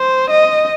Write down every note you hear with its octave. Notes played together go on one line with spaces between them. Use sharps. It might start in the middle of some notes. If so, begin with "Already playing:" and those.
Already playing: C5
D#5